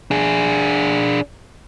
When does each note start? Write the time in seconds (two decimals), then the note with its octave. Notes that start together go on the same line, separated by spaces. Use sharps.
0.11 D4 G#4